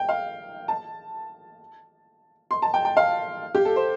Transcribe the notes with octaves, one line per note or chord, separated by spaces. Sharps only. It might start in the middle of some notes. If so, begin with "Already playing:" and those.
Already playing: G5
F5
A5
C6
A5
G5
G5
F5
G4
A4
C5